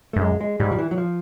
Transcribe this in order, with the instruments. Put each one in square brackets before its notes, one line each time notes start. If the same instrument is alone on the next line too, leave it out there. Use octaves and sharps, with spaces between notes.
[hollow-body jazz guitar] A3
[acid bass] G2
[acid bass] F#2 [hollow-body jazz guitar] G#3
[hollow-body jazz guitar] G#3
[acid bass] G#2 [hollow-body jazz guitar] G3
[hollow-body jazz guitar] F3
E3
F#3
F3